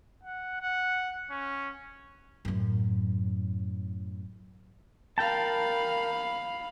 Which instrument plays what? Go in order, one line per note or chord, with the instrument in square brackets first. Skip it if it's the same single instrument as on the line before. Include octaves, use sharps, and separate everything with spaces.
[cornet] F#5
F#5
C#4
[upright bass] F#2 A2
[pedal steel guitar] A#4 G5 A5 [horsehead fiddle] F5 B5